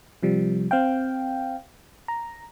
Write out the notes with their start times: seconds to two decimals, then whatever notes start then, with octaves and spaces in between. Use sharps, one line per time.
0.23 C3 F3 G3
0.71 C4 F5 G5
2.08 A#5